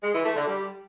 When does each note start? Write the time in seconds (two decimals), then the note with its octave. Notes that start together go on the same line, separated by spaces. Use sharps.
0.03 G#3
0.14 E3
0.25 A3
0.36 D3
0.47 G3